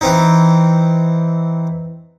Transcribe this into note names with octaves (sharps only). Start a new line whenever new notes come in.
E3 C4 D#4